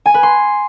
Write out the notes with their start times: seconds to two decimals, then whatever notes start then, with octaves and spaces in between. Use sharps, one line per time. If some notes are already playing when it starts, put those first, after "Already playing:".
0.06 G#5
0.14 B4
0.23 C6